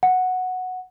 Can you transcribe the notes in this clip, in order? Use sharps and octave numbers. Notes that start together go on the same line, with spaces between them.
F#5